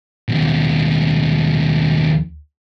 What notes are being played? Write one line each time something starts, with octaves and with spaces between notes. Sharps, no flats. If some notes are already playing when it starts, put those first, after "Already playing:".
D#2 B2